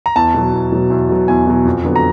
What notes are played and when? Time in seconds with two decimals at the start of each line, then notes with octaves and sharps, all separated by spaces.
0.06 A#5
0.16 E2 A5
0.34 B2 F#3
0.53 E2
0.72 B2 F#3
0.90 E2
1.09 B2 F#3
1.28 E2 G#5
1.47 B2 F#3
1.65 F2
1.84 D3 F#3 B3
1.96 A#5